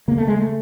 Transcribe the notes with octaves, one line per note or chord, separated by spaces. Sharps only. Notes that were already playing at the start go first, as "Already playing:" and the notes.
C#3 A#3
A3
G#3
A3